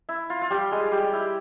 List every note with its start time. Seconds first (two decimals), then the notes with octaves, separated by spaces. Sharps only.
0.09 E4
0.30 F4
0.42 F4
0.51 G3 G4
0.72 G#3 G#4
0.92 G3 G4
1.13 E4